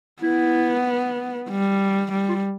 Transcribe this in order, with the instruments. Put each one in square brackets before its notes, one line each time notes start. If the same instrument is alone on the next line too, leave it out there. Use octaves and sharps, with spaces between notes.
[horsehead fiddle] B3 [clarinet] E4
[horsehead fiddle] G3
G3
[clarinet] F4